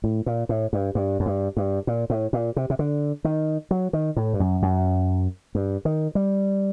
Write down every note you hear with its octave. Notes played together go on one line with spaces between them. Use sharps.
A2
A#2
A2
G2
G2
F#2
G2
G2
A#2
A2
A#2
C3
C3
D3
D#3
F#3
D#3
A2
G2
F#2
F#2
G2
D#3
G3